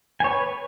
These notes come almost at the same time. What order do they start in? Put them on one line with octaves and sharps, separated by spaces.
G#5 C#5 B4